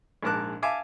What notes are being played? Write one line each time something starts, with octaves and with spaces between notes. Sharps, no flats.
A#1 G#2 A#4 A5 D6 F#6
E5 F5 G#5 A5 D6